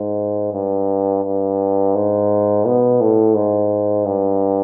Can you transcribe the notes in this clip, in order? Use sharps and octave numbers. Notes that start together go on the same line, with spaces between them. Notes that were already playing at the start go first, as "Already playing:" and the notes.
Already playing: G#2
G2
G2
G#2
B2
A2
G#2
G2